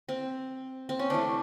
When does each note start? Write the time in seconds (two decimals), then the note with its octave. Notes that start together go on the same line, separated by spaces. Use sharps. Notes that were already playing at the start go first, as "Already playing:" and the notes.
0.09 C4
0.89 C4
0.99 C#4
1.10 C3 E3 A3 D4